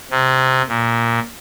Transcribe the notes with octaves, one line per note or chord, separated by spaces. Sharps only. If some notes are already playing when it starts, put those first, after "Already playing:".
C3
A#2